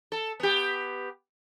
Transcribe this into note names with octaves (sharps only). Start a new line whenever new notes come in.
A4
B3 G4